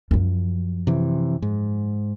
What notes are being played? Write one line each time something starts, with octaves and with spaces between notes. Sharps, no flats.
F#2 F3
C3 E3
G#2